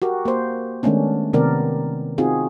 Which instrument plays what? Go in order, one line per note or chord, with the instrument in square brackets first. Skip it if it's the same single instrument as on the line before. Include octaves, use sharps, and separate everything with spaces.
[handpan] F#4 G4 A#4
A#3 C5
D#3 G#3 A3 B3 C#4 D4
C3 D#3 B3 C4 A#4 D5
C4 D#4 F4 F#4 G#4